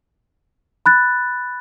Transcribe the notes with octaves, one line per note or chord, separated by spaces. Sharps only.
B5 F#6 A6